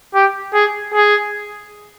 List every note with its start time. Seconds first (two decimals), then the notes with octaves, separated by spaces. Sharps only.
0.15 G4
0.54 G#4
0.94 G#4